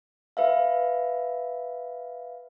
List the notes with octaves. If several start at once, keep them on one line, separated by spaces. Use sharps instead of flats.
B4 E5 F5